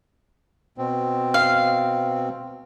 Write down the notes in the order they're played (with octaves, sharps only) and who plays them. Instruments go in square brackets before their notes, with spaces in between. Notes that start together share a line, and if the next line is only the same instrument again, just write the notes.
[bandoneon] B2 C4
[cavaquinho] F5